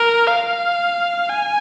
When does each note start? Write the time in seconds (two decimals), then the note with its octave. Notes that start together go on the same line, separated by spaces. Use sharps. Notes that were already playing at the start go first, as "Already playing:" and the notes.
Already playing: A#4
0.27 F5
1.29 G#5